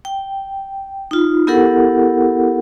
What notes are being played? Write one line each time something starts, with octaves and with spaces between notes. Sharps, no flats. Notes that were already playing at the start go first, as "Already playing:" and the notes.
G5
D#4 F4
B3 E4 G4 A4 A#4 F#5